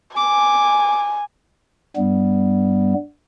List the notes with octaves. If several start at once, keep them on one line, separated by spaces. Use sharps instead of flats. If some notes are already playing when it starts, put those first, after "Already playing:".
G#5 D6
G2 G3 B3